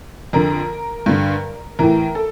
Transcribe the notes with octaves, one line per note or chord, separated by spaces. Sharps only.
F2 D3 A#4
G2 D3
A2 E3 A#4
A4